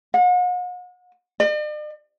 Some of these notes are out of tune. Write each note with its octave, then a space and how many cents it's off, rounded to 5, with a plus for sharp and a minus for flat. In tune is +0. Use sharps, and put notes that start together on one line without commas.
F#5 -45
D5 +45